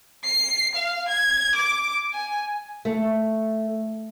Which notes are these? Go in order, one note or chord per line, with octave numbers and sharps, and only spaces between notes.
C7
F5
G#6
D6
G#5
A3